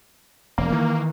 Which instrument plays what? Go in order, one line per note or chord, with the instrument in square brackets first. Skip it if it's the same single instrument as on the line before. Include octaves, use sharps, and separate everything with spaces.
[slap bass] E1 [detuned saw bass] A#3
[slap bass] D#3 E3